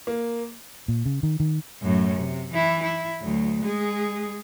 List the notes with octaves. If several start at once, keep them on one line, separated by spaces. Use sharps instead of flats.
A#3
A#2
C#3
D#3
D#3
F#2 A2
C3
E3 E4
E4
D2 F#3
G#3 G#4